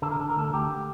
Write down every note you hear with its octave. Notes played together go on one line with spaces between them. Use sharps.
D3 A4
A#4
D3 A4
A#4
D2 A4
D2 G4